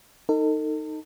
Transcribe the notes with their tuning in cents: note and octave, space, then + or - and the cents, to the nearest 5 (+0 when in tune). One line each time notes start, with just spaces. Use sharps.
D#4 +0 A4 +40